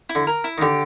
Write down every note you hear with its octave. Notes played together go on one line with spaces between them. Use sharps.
E4
D3
A#4
E4
D#3
D3 G4